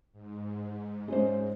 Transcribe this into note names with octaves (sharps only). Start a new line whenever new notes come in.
G#2
G#3 C#4 C5